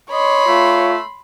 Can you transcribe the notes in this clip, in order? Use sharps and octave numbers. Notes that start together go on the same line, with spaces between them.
C#5 D#5 B5 C6
A3 F4